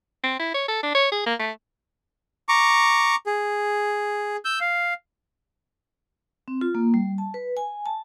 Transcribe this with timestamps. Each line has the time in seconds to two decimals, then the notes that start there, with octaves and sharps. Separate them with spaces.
0.23 C4
0.39 E4
0.54 C#5
0.68 A4
0.83 D4
0.94 C#5
1.12 G#4
1.26 A#3
1.39 A3
2.49 A#5 C#6 D6
3.26 G#4
4.45 E6 G6
4.61 F5
6.48 C4
6.61 F4
6.75 A#3
6.94 G3
7.18 A5
7.34 B4
7.57 G#5
7.86 A5